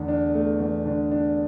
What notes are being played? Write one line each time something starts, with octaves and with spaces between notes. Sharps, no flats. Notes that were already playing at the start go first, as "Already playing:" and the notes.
Already playing: E2 D3 A3
D4
A3
E2
D3
D4